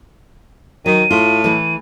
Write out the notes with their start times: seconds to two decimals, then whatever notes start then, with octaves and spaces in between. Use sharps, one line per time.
0.86 D#3 F#3 D#7
1.11 A2 F4
1.44 E3 A3